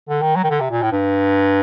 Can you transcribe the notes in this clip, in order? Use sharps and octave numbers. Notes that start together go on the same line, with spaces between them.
D3
D#3
F#3
D#3
D3
C3
A#2
A2
G2